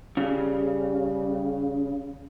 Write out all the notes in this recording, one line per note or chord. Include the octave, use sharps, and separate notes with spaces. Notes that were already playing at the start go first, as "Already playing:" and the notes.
C#3 G3